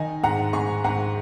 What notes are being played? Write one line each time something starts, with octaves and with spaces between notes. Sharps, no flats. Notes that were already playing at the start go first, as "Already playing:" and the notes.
Already playing: D#3 D#5 G#5
G#2 F#5 A#5
G#2 G#5 C#6
G#2 F#5 A#5